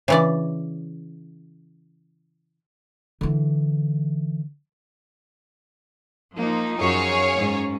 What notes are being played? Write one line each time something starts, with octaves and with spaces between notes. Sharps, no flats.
C#3 E3 D5
D3 E3
F3 A#3 D#4
F#2 G#4 C#5 F5
G#2 C#4